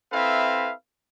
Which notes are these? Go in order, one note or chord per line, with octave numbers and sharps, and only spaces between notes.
C4 E4 A4 B4 E5 F5